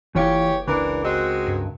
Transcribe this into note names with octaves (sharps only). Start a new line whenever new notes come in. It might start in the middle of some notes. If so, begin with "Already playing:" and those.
F#1 E3 F4 G4 C#5
C#2 E3 D4 A#4
G#3 C4 F#4
G2